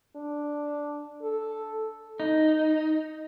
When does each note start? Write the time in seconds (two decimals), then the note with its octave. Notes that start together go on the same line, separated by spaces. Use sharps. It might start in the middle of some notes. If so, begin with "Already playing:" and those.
0.16 D4
1.22 A4
2.20 D#4